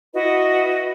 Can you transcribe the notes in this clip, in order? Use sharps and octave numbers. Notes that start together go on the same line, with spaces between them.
E4 F#4 B4 D#5